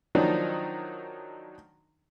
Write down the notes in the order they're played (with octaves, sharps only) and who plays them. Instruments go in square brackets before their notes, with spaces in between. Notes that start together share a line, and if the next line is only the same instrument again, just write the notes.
[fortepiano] D#3 F3 F#3 D4 D#4